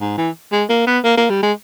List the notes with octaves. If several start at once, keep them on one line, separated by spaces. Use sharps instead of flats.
G#2
E3
G#3
A#3
B3
A#3
A#3
G3
G#3